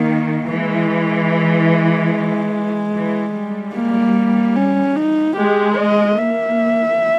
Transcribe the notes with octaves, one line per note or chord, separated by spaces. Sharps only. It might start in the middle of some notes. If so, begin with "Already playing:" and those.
Already playing: D#3 A#3
E3 G#3
E3
G3
A#3
C#4
D#4
G#3 G4
D#5
A#3 E5